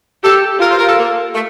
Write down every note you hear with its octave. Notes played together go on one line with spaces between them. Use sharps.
G4 A4
F4 A#4
C5
A#4
A4
A#3
A3